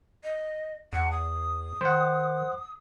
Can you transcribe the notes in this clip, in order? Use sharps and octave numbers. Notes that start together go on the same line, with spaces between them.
D#5
E2 F#5
D#6
D#3 C5 F#5